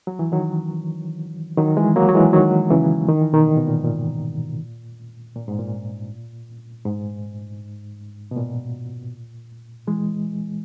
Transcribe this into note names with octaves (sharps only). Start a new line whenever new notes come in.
F#3
E3
D#3 F#3
D#3 F#3
E3 G#3
F#3 A#3
F#3
E3 G#3
D#3 F#3
C#3 E3
D#3
E3
B2 D#3
A#2
B2
A#2
G#2
A#2
A#2
G#2
A#2
G#2
B2
A#2
E3 G#3